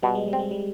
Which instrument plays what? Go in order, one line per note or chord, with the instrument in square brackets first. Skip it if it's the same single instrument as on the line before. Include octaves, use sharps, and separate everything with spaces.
[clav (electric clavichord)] B2 [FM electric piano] G3
[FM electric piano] G#3
G3
[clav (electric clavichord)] C4
[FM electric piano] G#3
G3